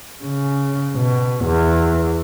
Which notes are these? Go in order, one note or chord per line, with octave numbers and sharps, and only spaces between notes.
C#3
B2
E2